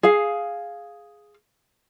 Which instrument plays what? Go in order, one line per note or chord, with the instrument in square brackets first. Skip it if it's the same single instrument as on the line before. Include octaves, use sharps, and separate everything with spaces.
[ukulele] G#4 F5